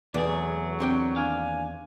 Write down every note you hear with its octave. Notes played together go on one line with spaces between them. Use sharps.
E2 B2 A3 G#4 D5
F#3
D3 C4 G4 G5
D#2 D4 F5 G#5